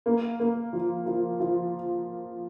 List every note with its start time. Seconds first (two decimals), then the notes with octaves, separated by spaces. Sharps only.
0.06 A#3
0.40 A#3
0.73 F3
1.06 F3
1.40 F3